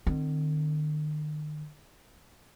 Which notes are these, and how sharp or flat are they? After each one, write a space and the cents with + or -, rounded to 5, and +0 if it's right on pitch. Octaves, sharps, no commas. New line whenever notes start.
D#3 -45 C4 +0